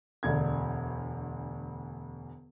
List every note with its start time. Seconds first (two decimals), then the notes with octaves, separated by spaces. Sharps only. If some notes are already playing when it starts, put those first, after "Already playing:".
0.23 E1 D2 G#6